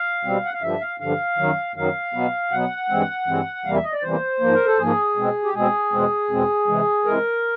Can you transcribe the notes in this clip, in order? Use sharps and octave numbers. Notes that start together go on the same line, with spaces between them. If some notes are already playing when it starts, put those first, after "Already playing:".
Already playing: F5
B2 G3 C4
F#5
F5
G2 D3 F3 E5
F5
G2 D3 F3 F5
F#2 D#3 F#3
F#2 D#3 F#3 F5
B2 F#3 B3
B2 F#3 B3 F#5
G2 E3 G#3 C4
G2 E3 G#3 C4
E2 C3 E3 G3 A#3 F5
E5
D#5
D5
E2 C3 E3 G3 A#3 C5
G#2 F3 A#3
A#4
A4
G#2 F3 A#3 G#4
B2 G#3 C4
G4
B2 G#3 C4 G#4
E2 B2 G#3 C4
E2 B2 G#3 C4
C3 E3 G#3
C3 E3 G#3 A#4